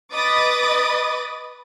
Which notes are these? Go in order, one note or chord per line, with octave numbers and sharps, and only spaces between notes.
B4 D#5 B5 D6 D#6 A6